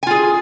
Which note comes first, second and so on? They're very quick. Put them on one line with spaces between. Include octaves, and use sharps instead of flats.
G#5 F4 G#4